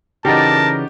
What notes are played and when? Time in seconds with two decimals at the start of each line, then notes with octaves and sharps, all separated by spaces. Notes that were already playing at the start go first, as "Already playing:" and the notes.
0.25 C#3 E3 D#4 F#4 G4 A#4 D5 A5